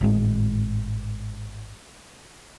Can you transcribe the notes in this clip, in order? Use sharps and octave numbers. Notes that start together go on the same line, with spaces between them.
G#1 A2 G#3